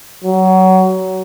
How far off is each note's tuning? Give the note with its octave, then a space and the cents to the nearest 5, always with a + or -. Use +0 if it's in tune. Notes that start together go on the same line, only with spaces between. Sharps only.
F#3 +20